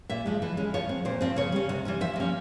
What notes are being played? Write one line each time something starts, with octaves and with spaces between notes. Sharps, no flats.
A#2 E5
F3 G#3
E3
G#3 C#4
F3 C#5
C4
A#2 C5
F3 C4
C#3 C#5
G3 C#4
C3
E3 G3 C#4
F3 E5
A#3 C#4